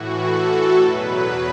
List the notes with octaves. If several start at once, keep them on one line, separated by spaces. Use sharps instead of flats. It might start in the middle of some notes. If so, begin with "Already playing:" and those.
Already playing: A2 E3 F#4
A4
E2 B2 F#3 B4